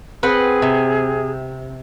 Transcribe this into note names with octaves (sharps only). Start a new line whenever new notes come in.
C4 G#4 B4 F#5
C3